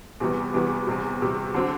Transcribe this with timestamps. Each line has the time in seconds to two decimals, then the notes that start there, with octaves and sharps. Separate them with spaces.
0.20 E2 C3 E3 G3 B3
0.54 E2 C3 E3 G3 B3
0.87 E2 C3 G3
1.21 E2 C3 G3
1.54 D3 F#3 C4